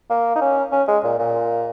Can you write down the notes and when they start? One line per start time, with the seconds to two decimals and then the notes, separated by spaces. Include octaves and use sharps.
0.10 A#3
0.35 D#4
0.41 C#4
0.72 C#4
0.88 G#3
1.04 A#2
1.19 A#2